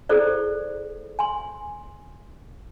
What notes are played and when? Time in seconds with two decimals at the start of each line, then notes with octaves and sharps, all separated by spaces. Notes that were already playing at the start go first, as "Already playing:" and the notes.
0.09 E4 G#4 A4 C5 D5
1.19 G#5 C6